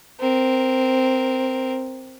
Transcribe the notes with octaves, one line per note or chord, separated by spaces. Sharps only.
C4 A#4